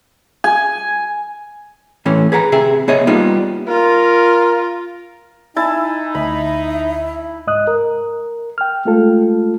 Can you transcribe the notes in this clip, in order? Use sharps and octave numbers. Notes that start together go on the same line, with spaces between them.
G#5
A2 E3 A3 C#4
G#4 B4 F#5 A#5
C3 G#4 E5
B3 G#4 C#5 D#5 E5
G3 A#3 B3 D#4 F4
F4 A#4
D#4 E4 G#5 A5
D2 E5 B5
C2 G#2 D#5 D#6 F#6
A#4
G5 F6
G#3 A3 F4 A4